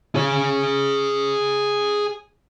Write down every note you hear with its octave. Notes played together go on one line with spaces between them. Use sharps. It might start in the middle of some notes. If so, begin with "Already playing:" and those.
G#4 C#5